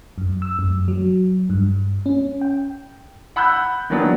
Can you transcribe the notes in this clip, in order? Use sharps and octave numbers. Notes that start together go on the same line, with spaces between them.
F#2
E6
F#2
F#3
G2
C#4
G5
F#5 B5 E6 F#6 G6
D#3 E3 F#3 B3 D4